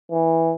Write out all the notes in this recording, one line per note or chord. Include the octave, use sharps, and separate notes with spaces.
E3